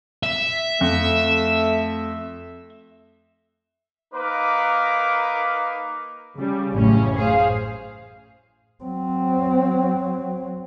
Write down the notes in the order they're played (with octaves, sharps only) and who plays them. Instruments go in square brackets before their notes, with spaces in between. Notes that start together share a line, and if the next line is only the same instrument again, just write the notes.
[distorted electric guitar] E5
[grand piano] F2 [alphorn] A3
[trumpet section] A#3 D#4 A#4 B4 D6
[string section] C#3 G3
A1 F#2 A2 C#3 C#4
G#4 C5 F5
[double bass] F#3 C4